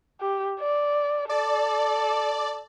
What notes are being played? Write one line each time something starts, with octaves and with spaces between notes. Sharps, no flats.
G4
D5
A4 D5